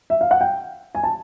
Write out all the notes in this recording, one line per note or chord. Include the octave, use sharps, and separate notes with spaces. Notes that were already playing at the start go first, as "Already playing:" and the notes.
E5
F5
F#5
G5
G#5
A5